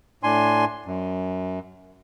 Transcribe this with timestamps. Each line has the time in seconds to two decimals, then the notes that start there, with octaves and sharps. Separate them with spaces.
0.23 A2 D4 G#5 C6
0.86 F#2